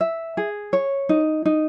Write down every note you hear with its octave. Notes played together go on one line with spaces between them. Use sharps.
E5
G#4
C#5
D#4
D#4